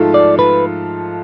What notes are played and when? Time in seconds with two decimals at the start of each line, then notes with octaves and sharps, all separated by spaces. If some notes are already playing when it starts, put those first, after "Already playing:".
Already playing: G#2 F3 A3 F4 A4
0.14 D5
0.39 B4